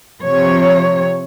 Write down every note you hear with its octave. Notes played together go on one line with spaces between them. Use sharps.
C3 F3 C#5